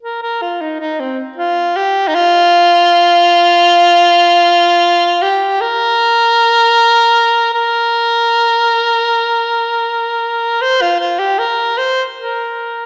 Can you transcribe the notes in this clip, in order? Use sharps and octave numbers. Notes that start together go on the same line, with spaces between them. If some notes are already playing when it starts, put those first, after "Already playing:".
A#4
A#4
F4
D#4
D#4
C4
F4
G4
D#4
F4
G4
A#4
A#4
C5
F4
F4
G4
A#4
C5
A#4